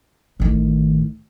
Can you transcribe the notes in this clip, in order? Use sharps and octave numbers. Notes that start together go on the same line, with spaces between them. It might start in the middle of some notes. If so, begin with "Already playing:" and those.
A1 D#3